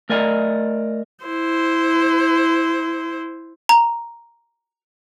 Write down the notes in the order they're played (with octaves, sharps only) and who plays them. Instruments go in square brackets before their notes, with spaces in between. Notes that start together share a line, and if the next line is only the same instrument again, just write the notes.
[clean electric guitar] A3 A#4 D5 D#5 A5 A#5
[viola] E4 C5
[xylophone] A#5